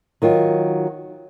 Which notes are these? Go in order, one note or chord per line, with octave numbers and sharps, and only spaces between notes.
D#3 F#3 F4